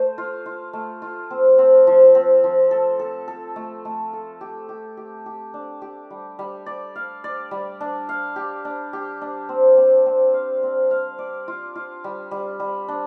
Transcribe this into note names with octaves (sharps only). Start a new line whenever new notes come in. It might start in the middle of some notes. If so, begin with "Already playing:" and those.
Already playing: A3 C5
F4
F4
A3
F4
C4
C4
F3
C4
F3
A4
A4
A4
A3
A3
A4
G4
G4
G4
G4
D4
G4
G3
G3
D5
F5
D5
G3
D4
F5
G4
D4
G4
D4
C4
C4
C4
F5
C4
F5
D5
F4
F4
G3
G3
G3
D4